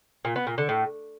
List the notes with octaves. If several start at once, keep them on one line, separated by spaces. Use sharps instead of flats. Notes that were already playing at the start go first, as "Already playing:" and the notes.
A#2
B3
A#2
D3
A2